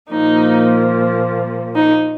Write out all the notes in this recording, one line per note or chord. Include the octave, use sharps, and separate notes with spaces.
A#2 F3 A#3 D#4
D#4